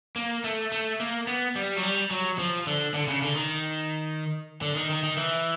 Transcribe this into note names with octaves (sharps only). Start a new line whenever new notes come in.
A#3
A3
A3
A#3
B3
G3
F#3
G3
F#3
F3
D3
D3
C#3
D3
D#3
D3
D#3
D#3
D#3
E3